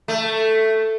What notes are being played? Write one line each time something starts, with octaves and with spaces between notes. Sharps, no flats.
A3